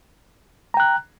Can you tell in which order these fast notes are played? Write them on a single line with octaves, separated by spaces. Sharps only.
A#5 G5 F#6